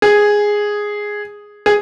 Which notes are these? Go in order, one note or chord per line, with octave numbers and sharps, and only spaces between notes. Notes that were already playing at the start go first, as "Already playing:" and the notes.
G#4
G#4